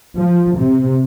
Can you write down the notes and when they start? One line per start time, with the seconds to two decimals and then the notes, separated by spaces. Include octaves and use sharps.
0.16 F3
0.58 C3